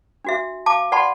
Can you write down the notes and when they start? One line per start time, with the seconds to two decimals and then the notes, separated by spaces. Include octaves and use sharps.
0.25 D4 F#4 E5
0.66 F5 A5 D6
0.92 B4 D5 F#5 A5 B5 C6